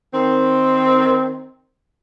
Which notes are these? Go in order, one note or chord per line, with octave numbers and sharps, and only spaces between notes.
D#3 C4